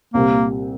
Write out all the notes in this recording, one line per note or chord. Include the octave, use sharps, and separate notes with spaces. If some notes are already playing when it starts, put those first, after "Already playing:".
C2 A#2 G3 A#3 C4 G4